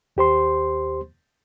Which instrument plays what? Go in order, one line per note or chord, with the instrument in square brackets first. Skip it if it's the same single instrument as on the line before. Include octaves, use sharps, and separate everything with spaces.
[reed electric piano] D#2 G4 C5 C6